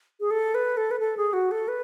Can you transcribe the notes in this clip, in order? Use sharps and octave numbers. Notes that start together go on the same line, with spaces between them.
G#4
A4
B4
A4
B4
A4
G#4
F#4
A4
B4